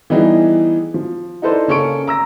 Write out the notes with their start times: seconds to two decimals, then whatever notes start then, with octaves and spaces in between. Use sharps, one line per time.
0.10 E3 G3 B3 D#4 E4 G#4
0.94 F3
1.42 D#4 E4 A4 B4 C5 D5
1.68 C#3 A#3 C#4 A4 C#6 D7
2.07 A#5 E6 A#6